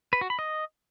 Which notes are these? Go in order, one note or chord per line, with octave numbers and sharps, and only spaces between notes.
B4
F#4
B5
D#5